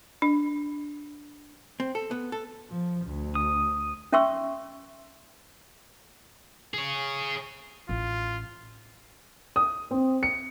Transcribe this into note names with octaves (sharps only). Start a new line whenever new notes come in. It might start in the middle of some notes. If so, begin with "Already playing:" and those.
D4
C4
A4
B3
A4
F3
D2
D#6
C#4 E5 G5 C6 C#6 E6
G#4 C#5
A1 F4
D#6
C4
C#7